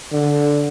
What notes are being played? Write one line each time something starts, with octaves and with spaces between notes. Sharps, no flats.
D3